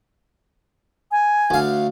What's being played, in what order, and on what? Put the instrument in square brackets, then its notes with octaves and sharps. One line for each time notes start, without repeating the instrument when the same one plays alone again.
[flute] G#5
[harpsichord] D2 F5